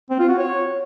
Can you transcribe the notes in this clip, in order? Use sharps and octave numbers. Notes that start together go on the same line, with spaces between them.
C4
F4
F#4
C#5